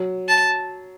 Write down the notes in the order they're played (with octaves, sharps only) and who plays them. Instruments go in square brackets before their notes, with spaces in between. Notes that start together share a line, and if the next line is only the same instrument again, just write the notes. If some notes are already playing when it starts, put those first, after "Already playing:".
Already playing: [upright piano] F#3
[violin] A5